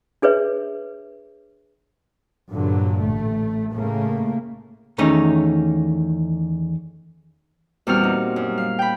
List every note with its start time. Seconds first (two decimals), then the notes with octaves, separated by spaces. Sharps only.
0.22 D4 G#4 B4 C#5 E5
2.51 G2 A#2 D3 F#3
3.01 A1 A3
3.73 A2 C#3 A3 A#3
4.98 E2 D#3 A3 C#4 D#4
7.87 E2 A#2 G3 C4 F#4 F6
8.03 D#4
8.36 F#2
8.58 F5
8.79 G5 B5